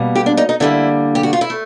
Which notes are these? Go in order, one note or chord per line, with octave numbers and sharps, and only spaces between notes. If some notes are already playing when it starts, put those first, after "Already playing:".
Already playing: B2 G3 A#3
G4
D4
D#4
D#4
D3 G3 A#3 E4
G4
F#4
F4
E4
A3